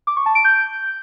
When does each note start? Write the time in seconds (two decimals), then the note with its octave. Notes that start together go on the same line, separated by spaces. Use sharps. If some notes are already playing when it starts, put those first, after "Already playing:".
0.07 D6
0.16 C#6
0.26 A5
0.35 D7
0.45 G6